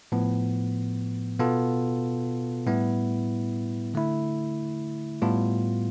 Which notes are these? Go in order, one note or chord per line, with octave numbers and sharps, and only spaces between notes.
A2 F3 B3
B2 B3 F4 A4
A2 G3 B3 E4
D3 A3 E4
A2 G3 B3 F4